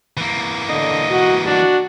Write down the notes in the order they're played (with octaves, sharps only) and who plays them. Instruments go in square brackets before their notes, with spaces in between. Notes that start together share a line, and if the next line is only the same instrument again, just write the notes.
[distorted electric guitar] E3 A#3
[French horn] D3 [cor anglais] D#5
[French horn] F#4
[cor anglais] D4 [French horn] F#4